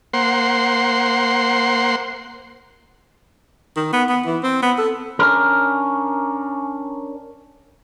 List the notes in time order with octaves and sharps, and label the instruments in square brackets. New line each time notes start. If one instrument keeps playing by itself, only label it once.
[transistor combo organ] A#3 C5 F#5 C6
[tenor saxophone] D#3
B3
B3
E3
C4
B3
A4
[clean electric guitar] C#4 D4 A#4